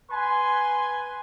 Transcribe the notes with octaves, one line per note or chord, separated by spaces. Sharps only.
B4 G#5 C6